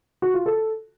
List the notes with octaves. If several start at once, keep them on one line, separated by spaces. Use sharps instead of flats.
F#4
F4
A4